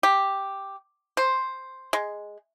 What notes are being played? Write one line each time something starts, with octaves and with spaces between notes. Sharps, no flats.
G4
C5
G#3